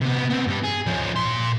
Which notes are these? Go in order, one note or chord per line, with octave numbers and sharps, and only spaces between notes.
C3 B3
B3 C4
G2 G3
G#4
F3 C#4
A#2 C6